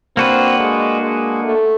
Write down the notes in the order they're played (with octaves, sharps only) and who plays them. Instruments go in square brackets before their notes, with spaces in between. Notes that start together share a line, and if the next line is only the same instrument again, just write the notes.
[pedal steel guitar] A#3 D4 F#4 B4 [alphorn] C4
[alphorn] G#3
G#3
A3